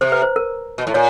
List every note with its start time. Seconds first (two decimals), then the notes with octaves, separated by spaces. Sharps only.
0.01 C3 C5
0.12 B4
0.22 C5
0.36 A#4
0.78 B2
0.87 A2
0.94 A#2 C#5